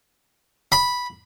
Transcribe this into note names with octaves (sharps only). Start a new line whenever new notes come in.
B5